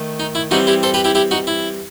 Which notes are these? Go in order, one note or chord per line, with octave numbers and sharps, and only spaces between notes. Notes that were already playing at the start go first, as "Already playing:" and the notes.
Already playing: D#3 A3
D#4
E4
E3 G3 C4 D#4 F#4
E4 G4
A4 C5
G4 B4
E4 G4
E4 G4
D#4 F#4
E4